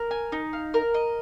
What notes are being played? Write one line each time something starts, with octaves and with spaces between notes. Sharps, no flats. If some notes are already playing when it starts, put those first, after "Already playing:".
Already playing: A#4
G#5
D#4
F5
A#4
D#5